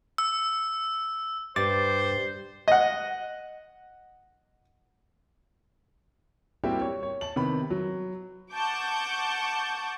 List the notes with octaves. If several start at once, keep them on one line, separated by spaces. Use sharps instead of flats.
E6
G2 C5 D6 A6
D#5 F#5
G3 A#3 C4 E4 F#4 G4
C#5
C#5
A5 F#7
C3 D#3 B3 B5
F#3
F#5 A5 C#6 D6 G6